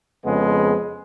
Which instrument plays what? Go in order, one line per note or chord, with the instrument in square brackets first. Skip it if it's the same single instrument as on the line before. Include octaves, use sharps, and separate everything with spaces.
[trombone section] F2 C#3 G#3 B3